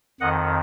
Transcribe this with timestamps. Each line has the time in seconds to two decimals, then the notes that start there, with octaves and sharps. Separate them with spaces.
0.21 F2 D#3 D#5 F#5